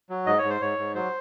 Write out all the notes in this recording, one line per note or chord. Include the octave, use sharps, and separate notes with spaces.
F#3
G#2 D#5
C#5
G#2
C5
G#2 C#5
G#2
F#3 C5